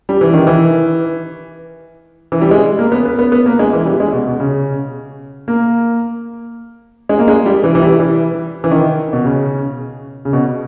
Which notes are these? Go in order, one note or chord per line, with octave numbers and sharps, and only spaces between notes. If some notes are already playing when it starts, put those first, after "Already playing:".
G3
E3
D#3
E3
E3
G3
G#3
A#3
B3
B3
B3
B3
A#3
G#3
E3
G3
G#3
B2
B2
C#3
A#3
G#3
A#3
G#3
G3
E3
E3
G3
E3
E3
D#3
B2
C#3
C#3
B2